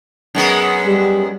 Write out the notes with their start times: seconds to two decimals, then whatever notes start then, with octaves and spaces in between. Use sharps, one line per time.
0.35 F#2 G#3 B3
0.86 G3